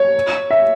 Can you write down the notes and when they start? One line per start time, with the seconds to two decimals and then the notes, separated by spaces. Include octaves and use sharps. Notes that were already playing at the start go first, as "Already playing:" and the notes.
Already playing: C#5
0.51 E5